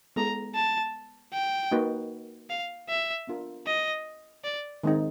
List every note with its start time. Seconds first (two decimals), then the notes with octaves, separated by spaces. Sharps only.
0.16 G#3 B3 E4 A4 A#5
0.55 A5
1.33 G5
1.71 A#3 D#4 F#4 B4
2.50 F5
2.89 E5
3.27 B3 D4 F4 A#4
3.66 D#5
4.44 D5
4.83 D#3 G#3 C4 D#4